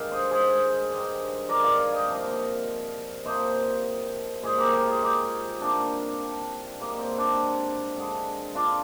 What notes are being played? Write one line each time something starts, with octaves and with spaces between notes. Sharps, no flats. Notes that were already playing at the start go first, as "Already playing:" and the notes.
Already playing: G2 D#3 G#3 A#3 F5 G5
C5 D#5
G#4 C5
G2 D#3 G#3
A#4 D5
D5 F5
F5 G#5
D#5 G5
C3 F3 A#3
C3 F3 A#3 C5 D#5
A#2 G#3 G#4 C5
G4 A#4
G4 A#4
F4 G#4
D#4 G4
C3 G3 A#3 D4
G#2 G3 A#3
C4
D4
D3 G#3
D4 F4